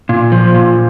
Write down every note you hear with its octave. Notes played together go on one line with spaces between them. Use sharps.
A#2
F3
A#2